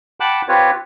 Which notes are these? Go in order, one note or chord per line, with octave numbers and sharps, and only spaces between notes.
F#5 G5 A5 B5 D6 F#6
C4 F4 G4 B4 C#5